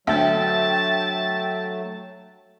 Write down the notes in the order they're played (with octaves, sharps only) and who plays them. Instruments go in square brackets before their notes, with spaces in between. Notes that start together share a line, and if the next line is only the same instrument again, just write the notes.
[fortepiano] D2 [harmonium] F#3 A3 [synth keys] E5 G5 [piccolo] A5